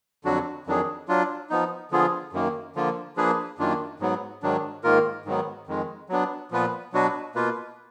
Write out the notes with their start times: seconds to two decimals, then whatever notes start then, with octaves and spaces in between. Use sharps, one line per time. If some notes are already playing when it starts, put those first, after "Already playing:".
0.24 F2 D3 F#3 D4 F#4
0.67 F2 D#3 F#3 D4 G#4
1.08 F#3 D4 F4
1.50 F3 B3 D#4
1.91 D3 F3 B3 F4 G#4
2.33 F#2 D#3 A#3
2.75 D3 F3 A#3 F4
3.17 F3 A#3 D4 G#4 B4
3.58 F#2 D#3 A#3 D4 F4
4.00 G#2 F#3 B3
4.42 G#2 D#3 F#3 D4
4.84 G#2 D#3 A#3 F4 A#4
5.26 G#2 D#3 F#3 B3
5.67 F2 D#3 G#3
6.09 F#3 B3 D4
6.51 A#2 F3 B3 F4 B4
6.93 B2 F#3 D4 F#4 B4
7.35 B2 A#3 F4 B4